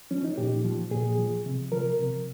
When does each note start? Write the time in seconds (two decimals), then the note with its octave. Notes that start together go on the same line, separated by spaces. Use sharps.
0.11 F3 C#4
0.24 D#4
0.37 A#2 G4
0.64 F3
0.91 A#2 G#4
1.18 F3
1.46 C3
1.72 F3 A#4
1.99 C3